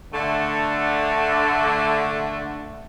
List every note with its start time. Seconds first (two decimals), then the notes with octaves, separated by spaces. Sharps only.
0.13 D3 A3